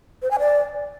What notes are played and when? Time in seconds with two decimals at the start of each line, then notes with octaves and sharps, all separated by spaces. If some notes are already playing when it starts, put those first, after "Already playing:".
0.22 C5
0.31 G#5
0.39 D5